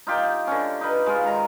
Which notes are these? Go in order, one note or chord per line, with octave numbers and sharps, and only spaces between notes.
D#4 F4 G4
D3 C#4
D#4 B4
G#3 F4
D#3 A#5